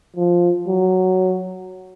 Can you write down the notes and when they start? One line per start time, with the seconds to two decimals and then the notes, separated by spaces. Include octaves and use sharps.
0.16 F3
0.68 F#3